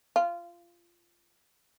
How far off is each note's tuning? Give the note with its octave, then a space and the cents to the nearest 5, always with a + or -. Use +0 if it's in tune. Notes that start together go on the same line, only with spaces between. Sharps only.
F4 -20